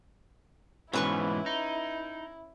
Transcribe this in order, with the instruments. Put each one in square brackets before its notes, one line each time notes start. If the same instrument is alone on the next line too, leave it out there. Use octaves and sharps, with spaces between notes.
[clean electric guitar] G#2 B2 E3 [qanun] C#4 B4 C#6 [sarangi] E4
[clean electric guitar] D#4